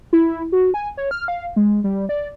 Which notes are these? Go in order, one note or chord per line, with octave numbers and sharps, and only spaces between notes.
E4
F#4
G#5
C#5
F6
F5
G#3
G3
D5